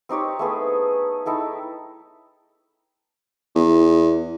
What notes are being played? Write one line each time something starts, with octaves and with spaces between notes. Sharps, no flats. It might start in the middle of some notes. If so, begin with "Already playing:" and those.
C4 D#4 G4 C#5
A3 B3 G#4
D#4 E4 A4 G5
E2